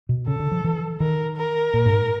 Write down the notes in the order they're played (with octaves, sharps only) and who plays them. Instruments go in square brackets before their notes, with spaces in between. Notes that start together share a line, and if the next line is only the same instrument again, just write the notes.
[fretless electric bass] B2
[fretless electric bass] C#3 [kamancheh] A4
[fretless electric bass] D3
F3
E3
[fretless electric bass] D#3 [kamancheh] A#4
[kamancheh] A#4
[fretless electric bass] A#2
G#2